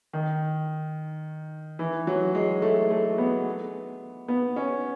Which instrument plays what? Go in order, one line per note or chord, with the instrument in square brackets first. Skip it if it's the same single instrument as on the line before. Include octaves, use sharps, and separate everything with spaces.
[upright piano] D#3
E3
F#3
G#3
A3
A3
B3
B3
C#4